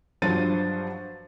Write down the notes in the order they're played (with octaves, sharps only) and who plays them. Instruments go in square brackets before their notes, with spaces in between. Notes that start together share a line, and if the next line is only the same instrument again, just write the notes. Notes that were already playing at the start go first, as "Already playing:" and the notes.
[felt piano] G2 F3 F#3 C5 A6 D#7